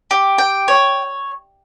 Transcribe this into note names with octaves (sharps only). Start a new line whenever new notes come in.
G4
G5
C#5